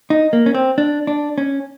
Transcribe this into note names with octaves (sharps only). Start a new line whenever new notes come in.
D#4
A#3
C#4
C4
D4
D4
C#4